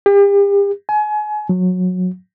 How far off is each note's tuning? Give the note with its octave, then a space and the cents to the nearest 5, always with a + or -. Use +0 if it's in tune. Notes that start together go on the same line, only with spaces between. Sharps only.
G4 +40
G#5 +30
F#3 -20